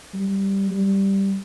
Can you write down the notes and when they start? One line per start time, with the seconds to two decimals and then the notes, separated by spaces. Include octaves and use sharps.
0.13 G3
0.71 G3